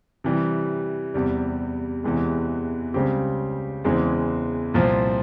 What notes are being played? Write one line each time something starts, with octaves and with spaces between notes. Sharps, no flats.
C3 E3 G3
E2 C3 G3
E2 C3 E3 G#3
C#2 C#3 G3 C4 G4
E2 C#3 E3 G#3 C4
C2 A#2 F3 C4